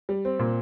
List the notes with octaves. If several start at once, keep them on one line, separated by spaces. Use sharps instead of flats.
G3
C4
A#2